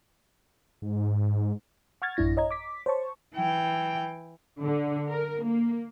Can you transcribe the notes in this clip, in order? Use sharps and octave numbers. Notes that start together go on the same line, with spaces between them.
G#2
F#5 C#6 F6 G#6 A6
A1 F#2 D4 E4 A#6
C#5 D#5 A#5 G#6
D6 B6
C5 C#5 A5 C#6
E3 G5
D3
A#4
A#3